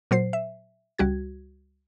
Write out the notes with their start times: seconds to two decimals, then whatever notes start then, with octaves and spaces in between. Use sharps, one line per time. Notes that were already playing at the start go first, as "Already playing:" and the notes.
0.11 A#2 F#3 C5 C7
0.33 E5
0.98 C#2 G3 F#4 G#6